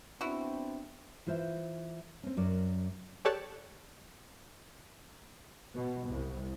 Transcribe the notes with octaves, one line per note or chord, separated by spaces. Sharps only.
B3 C4 D4 E4 F#4
E3 F4 C5 E5
C4 C#4
F#2 A#4 D5
G4 A4 C#5 D5 A5 F#6
B2
C2